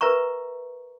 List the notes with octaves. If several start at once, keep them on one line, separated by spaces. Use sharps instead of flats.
A#4 B4 E5 A#5 C#6